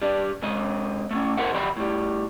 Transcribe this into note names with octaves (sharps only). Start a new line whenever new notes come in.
G3 D4
C3 G#3 D#5
A3 A#3 C#4
A4 A#4 C5 E5 F#5
D#3 F#3 G3 D5 G5 B5
A2 G3